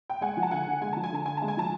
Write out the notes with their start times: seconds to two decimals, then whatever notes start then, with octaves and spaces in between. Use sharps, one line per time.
0.10 G5
0.21 G#3 F#5 G#5
0.37 F3
0.43 A5
0.51 D3 F#5 G#5
0.66 D3
0.81 G#3 G#5
0.93 F3 A5
1.03 G#5
1.12 D3 A5
1.26 D3 G#5
1.37 G#3 A5
1.48 G#5
1.57 F3 A5